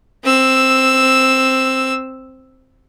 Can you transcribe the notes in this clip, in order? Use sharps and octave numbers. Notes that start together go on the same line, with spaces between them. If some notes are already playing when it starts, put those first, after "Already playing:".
C4 E6